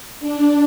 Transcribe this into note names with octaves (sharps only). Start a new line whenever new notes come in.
D4